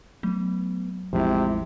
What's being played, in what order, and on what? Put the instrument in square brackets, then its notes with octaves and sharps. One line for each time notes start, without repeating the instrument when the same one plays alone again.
[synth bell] F#3 [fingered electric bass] A3 B3
[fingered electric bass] A1 E2 [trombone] C3 [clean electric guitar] F3 G#3 E4